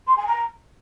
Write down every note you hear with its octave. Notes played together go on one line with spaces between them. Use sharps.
C6
G#5
A#5